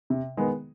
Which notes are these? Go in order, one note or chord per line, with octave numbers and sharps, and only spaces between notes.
C3
D#3 G#3 B3